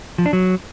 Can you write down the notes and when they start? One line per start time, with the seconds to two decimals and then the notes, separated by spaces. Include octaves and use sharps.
0.18 F3
0.26 D4
0.33 F#3